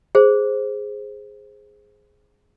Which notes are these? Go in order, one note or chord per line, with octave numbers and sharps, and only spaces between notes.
G#4 C5